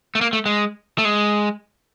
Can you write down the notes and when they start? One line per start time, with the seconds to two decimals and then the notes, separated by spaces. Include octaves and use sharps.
0.15 A3
0.21 A#3
0.33 A3
0.46 G#3
0.98 A3
1.05 G#3